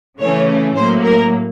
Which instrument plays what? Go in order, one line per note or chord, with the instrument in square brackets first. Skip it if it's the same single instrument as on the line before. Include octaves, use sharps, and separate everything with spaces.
[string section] C#3 E3 A3 C#4 C#5
A2 F#3 A#3 C5
A#4